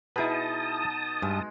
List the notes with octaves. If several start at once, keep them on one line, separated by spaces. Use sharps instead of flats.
B2 D#4 E4 G#4 B4 A5 D#6
G2 G#3